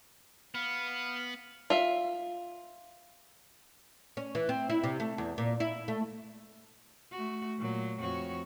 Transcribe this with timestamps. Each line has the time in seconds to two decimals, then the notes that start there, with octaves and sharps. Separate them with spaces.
0.55 B3 F5
1.70 F4 E5
4.17 C#4
4.35 E3
4.49 C4
4.70 E4
4.84 C3
5.00 A3
5.18 E2
5.38 A#2
5.60 E4
5.88 A3
7.12 A3 F#4
7.58 A#2 F#3
7.99 F2 F#4 C#5